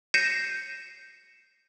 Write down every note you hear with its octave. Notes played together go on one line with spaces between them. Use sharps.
G6 A#6 C7 C#7 D#7 E7